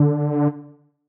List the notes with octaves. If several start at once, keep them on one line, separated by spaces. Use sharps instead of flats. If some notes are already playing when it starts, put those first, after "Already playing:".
Already playing: D3